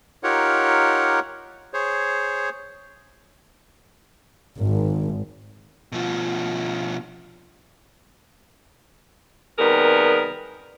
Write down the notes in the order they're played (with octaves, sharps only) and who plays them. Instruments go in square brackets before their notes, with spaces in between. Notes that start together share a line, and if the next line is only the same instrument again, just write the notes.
[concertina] D#4 F4 G4 A#4 C#5 F#5
G#4 C5 C#5
[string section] G#1
[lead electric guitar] B2 F3
[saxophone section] C3 D#3 G3 B3 G#4 A#4